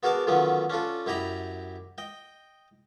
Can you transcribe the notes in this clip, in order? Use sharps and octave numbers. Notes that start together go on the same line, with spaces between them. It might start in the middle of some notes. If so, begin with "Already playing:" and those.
B3 F#4 G#4 A#4 D5 A5
D3 D#3 F3 F#3 B3 C#4
C#4 D4 F4 A4
F#2 E4 G4 D#5 A#5 B5
D#5 G5